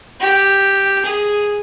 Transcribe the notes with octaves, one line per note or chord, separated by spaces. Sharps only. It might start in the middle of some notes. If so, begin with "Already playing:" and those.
G4
G#4